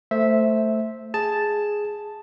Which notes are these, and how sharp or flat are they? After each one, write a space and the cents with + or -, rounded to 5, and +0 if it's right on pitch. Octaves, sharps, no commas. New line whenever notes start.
A3 +10 C5 +0 E5 -10
G#4 +0 A5 +0